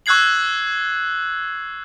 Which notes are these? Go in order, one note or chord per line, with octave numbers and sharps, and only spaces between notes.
C#6 E6 F#6 G#6 C7 F#7